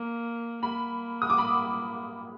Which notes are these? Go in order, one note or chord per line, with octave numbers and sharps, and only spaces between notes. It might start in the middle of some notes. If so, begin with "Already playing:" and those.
Already playing: A#3
A#3 B5
D#6
D6
B5